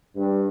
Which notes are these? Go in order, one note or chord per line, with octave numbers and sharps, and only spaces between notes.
G2